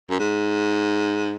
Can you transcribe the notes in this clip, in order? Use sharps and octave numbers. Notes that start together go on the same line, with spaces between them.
F#2
G#2